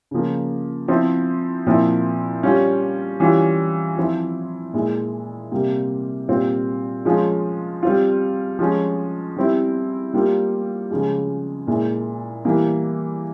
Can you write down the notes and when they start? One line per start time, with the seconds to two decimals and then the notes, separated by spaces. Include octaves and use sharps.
0.11 C#3 F3 A#3
0.88 F3 C4 E4
1.66 A#2 F3 C4 E4
2.43 G3 C#4 F4
3.20 E3 G3 C#4 F4
3.97 F3 C4 E4
4.73 A#2 G#3 E4
5.52 C3 G3 A#3
6.28 A#2 G3 C4 F4
7.05 F3 G#3 C#4 F4
7.83 G3 C4 F4
8.59 F3 G#3 C#4
9.37 G3 C4 E4
10.14 G3 A#3 F4
10.91 C#3 F3 G#3
11.67 A#2 G#3 E4
12.44 E3 G3 A#3 E4